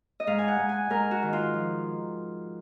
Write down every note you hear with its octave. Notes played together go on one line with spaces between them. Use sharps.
D#5
G#2 F5
G#5
F#5
G#2
G#5
G#2 A#4
F#4
D#3
F4
F3